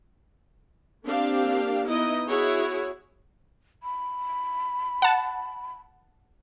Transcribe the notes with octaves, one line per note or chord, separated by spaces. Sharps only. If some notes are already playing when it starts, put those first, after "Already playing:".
A#3 C4 D4 G4 F5
B3 D#4 E4 D#5
E4 F#4 G#4 C#5
B5
F#5 A5